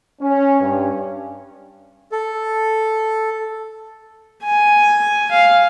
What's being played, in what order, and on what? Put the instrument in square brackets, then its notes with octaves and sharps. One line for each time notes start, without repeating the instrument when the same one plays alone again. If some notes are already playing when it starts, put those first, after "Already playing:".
[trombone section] C#4
G2
[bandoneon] A4
[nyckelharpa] G#5
F5